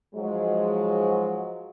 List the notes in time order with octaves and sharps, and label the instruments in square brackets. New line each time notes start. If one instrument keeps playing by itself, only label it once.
[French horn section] G#2 F3 F#3 G#3